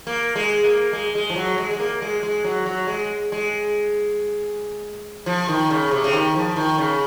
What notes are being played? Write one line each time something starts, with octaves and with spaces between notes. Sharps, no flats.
A#3
G#3
A#3
G#3
G#3
F3
F#3
G#3
G#3
A#3
G#3
G#3
F#3
F#3
G#3
G#3
F3
D#3
C#3
C3
C#3
D#3
F3
D#3
C#3